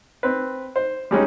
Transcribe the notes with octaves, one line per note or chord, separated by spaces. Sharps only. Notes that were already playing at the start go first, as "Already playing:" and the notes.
C4 B4
C5
G3 G#3 C#4 D#4